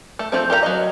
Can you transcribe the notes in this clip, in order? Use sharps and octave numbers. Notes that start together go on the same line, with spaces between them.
A3
F3 A3 C4
G4 A#4 F5 A#5
F#3 D#5